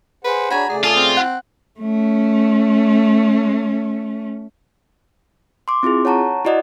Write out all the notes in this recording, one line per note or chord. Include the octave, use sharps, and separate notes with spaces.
G#4 B4 C5 F#5
D4 F#4 G#4 C#5 G#5 A#5 B5
C#3 A3 G#4 D5
F4 G#4 A4 A5 D#6
C4
F#5
A3 C#4
C6 D6
C4 E4 F4 G#4
C#5 F#5 A5 A#5 C#6
E4 F#4 D5 D#5 F#5